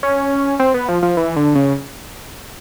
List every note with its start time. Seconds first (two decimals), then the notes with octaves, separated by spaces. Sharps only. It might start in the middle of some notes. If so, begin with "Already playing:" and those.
0.03 C#4
0.59 C4
0.74 B3
0.89 F3
1.02 F3
1.17 E3
1.36 D3
1.55 C#3